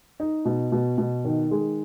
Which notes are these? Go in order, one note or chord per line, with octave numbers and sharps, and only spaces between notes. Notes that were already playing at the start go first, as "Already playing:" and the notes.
D#4
B2
B2
B2
D#3
G#3